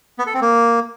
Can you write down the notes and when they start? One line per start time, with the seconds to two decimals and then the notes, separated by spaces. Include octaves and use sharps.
0.19 B3
0.26 A4
0.34 C4
0.41 A#3